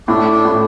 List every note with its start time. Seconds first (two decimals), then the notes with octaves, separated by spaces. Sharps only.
0.07 A2 D4
0.32 D4
0.45 A2